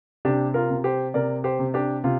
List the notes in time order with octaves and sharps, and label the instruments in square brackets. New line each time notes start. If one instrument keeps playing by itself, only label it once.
[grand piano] C3 D4 G4
F4 A#4
C3
G4 C5
C3 A#4 D5
G4 C5
C3
D4 G4
C3 F4